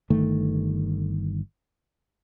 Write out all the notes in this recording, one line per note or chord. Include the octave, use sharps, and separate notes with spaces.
G1 D#3 A3